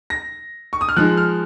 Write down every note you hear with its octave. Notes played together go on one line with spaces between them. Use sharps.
A#6
C#6
D#6
F6
F3 G#3 D#4 F#6
F6